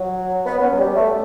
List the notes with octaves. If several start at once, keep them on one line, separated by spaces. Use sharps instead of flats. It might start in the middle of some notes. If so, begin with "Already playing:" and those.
Already playing: F#3
B3
B3
C#4
F#3
G3
A3